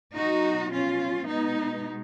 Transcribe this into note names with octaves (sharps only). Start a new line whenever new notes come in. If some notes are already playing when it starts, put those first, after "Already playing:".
B2 F#3 D#4 F#4
C#4 F4
B2 G#3 B3 D#4